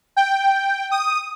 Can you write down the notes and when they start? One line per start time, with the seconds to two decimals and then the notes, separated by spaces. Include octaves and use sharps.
0.17 G5
0.91 D#6